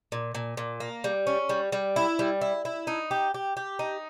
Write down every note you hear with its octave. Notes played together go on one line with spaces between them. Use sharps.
A#2
A#2
A#2
A#3
G3
C#4
G3
G3
E4
G3
E4
E4
D#4
G4
G4
G4
D#4